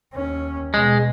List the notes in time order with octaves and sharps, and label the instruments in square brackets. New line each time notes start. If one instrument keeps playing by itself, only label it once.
[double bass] D#2 C#4
[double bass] B2 [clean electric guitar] G#3